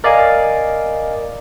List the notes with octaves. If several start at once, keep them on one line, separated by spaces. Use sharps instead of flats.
A#4 D5 D#5 F5 G#5